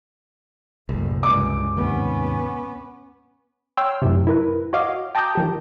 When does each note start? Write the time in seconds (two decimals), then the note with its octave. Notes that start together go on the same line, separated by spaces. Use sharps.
0.89 F#1 C2 A2
1.23 C#2 G2 D6
1.77 D#2 G#2 C3 B3 C#4
3.77 C#5 G5 C6 E6 F6
4.02 F#2 A2 C3
4.27 E4 A#4 B4
4.73 F#4 C#5 D#5 F5 D6
5.15 G5 A5 A#5 D6 D#6 G6
5.35 D#3 F3 G4